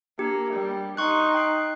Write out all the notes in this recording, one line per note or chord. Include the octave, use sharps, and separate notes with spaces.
A#3 D4 G4
G3
D#4 C6 C#6 F#6
G5 F#6 C7